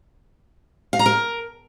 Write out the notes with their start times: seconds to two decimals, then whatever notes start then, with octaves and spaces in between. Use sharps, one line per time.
0.93 F5
0.99 A#5
1.06 A#4